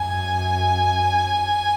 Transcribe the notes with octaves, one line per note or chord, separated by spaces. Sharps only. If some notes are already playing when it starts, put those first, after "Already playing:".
Already playing: F#2 G#5